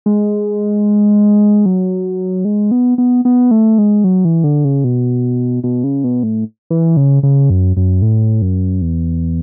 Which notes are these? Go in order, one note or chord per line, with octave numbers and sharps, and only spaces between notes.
G#3
F#3
G#3
B3
B3
B3
A3
G#3
F#3
E3
D3
C#3
B2
B2
C#3
B2
A2
E3
C#3
C#3
F#2
F#2
A2
F#2
E2